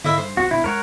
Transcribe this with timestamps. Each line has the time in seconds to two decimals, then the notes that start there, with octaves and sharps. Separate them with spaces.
0.04 G#2 D3 E4 D#5 E5
0.18 G2 C5
0.37 B1 F#2 C4 F#4
0.51 B1 B2 D4 E4
0.64 F#2 G#3 A#4 C#5 F#5